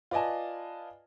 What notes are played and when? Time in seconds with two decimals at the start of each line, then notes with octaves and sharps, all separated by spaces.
0.11 F4 B4 D5 D#5 G#5 A5